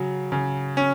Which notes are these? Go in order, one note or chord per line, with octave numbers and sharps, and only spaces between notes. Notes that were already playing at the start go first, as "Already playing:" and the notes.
Already playing: C#3 F#3
C#3
C#4